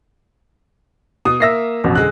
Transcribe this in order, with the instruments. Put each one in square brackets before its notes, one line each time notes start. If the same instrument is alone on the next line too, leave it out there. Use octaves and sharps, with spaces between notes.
[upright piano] B2 [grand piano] D#6
[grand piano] A#3 E5 [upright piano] E6 A#6 C7
[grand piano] A1 F2 B2
[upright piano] D3 G#3 [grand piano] F#6